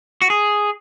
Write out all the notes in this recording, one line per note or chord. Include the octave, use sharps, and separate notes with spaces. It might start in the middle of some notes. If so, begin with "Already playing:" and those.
F#4
G#4